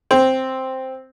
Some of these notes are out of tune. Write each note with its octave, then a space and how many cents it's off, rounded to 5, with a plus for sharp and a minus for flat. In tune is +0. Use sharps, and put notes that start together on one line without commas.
C4 +0